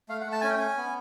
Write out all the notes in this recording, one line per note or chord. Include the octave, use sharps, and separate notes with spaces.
A3 F5
F#5
A3
A5
C#4 G#5
G5
C#4 G#5
B3